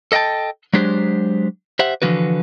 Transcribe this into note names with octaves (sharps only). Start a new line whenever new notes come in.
A4 D#5 F#5 G5 A5
F#3 G#3 D4 G4 C5
G4 C5 E5 F#5
D3 E3 F3 A#3 F#4 B4